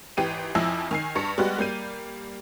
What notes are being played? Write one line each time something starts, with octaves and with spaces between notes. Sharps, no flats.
G#1 E3 G4 G5 D#7
F2 F3 E4 G#5 E6 A#6
D#3 G#5 C7
G2 C#6 C#7
G3 G#3 B3 F#4 G4
G3 A#3 G6 D#7